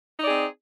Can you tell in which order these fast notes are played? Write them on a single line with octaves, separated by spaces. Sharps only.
D#4 D5 G#4 C4